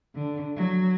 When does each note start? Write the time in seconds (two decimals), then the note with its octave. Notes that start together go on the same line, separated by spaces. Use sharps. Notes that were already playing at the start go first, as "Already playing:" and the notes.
0.14 D3
0.57 F#3